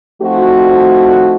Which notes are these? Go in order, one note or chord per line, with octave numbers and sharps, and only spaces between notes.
F3 A3 C4 D#4 F#4